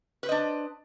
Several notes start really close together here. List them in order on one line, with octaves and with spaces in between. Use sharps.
B4 C5 D#5 D4